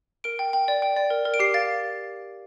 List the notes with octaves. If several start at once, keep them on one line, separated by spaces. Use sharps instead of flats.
A#4 D7
G5
G5
D5
G5
D5
A#4
A#4
D7
G4 C7
F5 A6